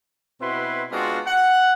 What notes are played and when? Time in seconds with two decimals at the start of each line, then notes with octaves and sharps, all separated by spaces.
0.41 B2 C4 E4 F#4 B4 C6
0.91 G#3 B3 C4 D4 F4 F#4
1.27 F#5